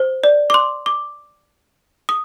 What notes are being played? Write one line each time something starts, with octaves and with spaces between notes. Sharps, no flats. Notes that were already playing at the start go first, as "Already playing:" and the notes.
Already playing: C5
D5
D6
C6
D6
D#6